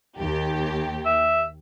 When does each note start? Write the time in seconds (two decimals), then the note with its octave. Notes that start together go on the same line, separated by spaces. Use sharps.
0.17 D#2 G4
1.05 E5